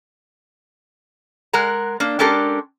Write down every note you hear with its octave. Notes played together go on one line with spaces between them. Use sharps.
G#3 A#4 F#5 A#5
A#3 D4
G#3 C#4 D4 G4 A4 A#4